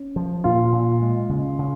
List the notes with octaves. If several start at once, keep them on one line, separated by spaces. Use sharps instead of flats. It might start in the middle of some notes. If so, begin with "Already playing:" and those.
Already playing: C#4
F3
A#2 F4
A#2
G#3
C#3
C#3